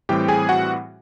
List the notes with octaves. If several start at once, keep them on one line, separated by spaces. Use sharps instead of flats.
A2 E3 G3 C4 G4 G5
G#4 G#5
F#4 F#5